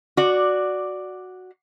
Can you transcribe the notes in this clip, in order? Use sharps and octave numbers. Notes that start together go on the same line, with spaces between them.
F#4 D5